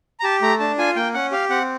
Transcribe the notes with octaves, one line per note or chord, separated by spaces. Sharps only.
A#5
G4 A5
A3 A#5
D4 A5
F4 G#5
A#3 G5
C#4 F#5
G4 F5
C4 F#5